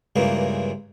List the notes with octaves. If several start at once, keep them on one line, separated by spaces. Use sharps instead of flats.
C#2 G2 C#3 E3 A3 A#3